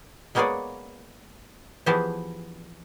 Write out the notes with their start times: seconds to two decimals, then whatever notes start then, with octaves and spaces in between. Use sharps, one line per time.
0.35 G#3 A#3 B3 G#4 C#5 D5
1.86 E3 F3 B3 G4 G#4 A5